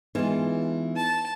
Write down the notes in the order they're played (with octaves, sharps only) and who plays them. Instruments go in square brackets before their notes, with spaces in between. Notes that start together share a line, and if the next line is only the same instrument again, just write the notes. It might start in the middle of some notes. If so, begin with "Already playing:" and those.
[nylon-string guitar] E3 G#3 F4 [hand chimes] B3 D#4 B4
[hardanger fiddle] A5